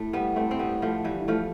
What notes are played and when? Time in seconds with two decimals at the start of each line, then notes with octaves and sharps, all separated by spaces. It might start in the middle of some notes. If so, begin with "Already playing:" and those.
Already playing: A2 A3
0.13 G3 B3
0.36 A3 C4
0.51 C4
0.59 G3 B3
0.82 F3 A3
1.04 E3 G3
1.20 G2
1.28 A2 F3 A3